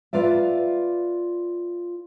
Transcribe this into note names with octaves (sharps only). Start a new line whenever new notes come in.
F4 B4 D5 E5